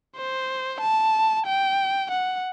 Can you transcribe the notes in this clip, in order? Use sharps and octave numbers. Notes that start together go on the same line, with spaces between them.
C5
A5
G5
F#5